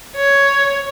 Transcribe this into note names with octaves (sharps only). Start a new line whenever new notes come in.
C#5